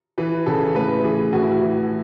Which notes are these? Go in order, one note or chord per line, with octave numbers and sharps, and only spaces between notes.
E3 B4
C#3 A4
A2 B4
E3 G#4
A2 F#4
E4
F#4
E3